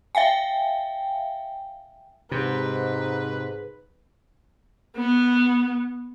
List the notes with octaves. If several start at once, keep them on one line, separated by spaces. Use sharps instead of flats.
E5 F5 G5 G#5
G#2 C3 B4
B3